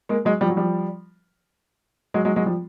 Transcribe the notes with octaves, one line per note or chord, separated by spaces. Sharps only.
G#3 A#3
F#3 G#3
F3 G3
F#3
F3 G3
F#3 G#3
F#3 G#3
F#3 G#3
F3 G3